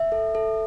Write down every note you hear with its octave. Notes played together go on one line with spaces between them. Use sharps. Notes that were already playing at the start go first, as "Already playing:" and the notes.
Already playing: E5
A4
A4